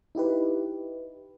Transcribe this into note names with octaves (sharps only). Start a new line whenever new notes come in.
D#4 E4 G4 B4